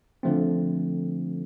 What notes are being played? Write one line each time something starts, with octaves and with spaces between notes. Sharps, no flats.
D3 F3 A3 C4